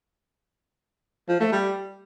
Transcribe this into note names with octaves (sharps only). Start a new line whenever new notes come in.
F3
A3
G3